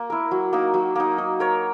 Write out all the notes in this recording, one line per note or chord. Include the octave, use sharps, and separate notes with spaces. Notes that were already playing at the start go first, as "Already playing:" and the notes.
Already playing: A#3
E4 A#4
F#3
A#3 D#4
F#3
A#3 D#4
D#4
A#4 C#5